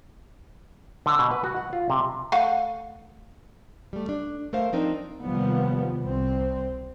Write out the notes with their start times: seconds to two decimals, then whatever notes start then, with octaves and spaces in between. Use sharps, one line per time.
1.06 D3
1.19 B2
1.31 B4
1.44 F#4
1.56 F#5
1.73 F4
1.90 C3
2.32 A3 F5 F#5
3.93 G3 A3
4.09 D4
4.53 A3 A#4 C5 F5
4.73 F3 C4 D4 D#4 A#4
5.22 D#2 C3 F3 G3 B3
6.01 C2 C4